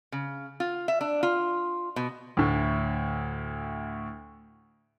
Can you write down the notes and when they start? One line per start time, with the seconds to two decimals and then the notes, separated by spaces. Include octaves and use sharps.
0.12 C#3
0.60 F4
0.88 E5
1.01 D4
1.23 F4
1.96 B2
2.37 D2 A2